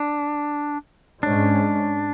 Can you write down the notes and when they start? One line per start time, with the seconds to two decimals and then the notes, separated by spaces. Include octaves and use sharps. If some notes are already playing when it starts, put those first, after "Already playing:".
Already playing: D4
1.23 G#2 G#3 C#4 D4